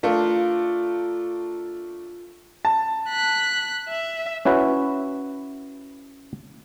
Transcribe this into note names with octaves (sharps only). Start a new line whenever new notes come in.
A3 D4 F4 A#4
A5
F#6 B6
E5
C#4 E4 F#4 B4